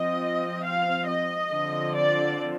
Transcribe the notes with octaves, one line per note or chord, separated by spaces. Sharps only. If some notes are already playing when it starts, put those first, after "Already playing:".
Already playing: F3 C4 D#5
F5
D#5
D3 F3 C4
D5